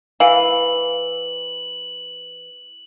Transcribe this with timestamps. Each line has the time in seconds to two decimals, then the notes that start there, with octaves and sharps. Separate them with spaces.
0.20 E3 F5 F#7